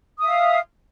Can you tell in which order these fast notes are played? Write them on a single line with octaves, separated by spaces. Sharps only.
D#6 E5 F5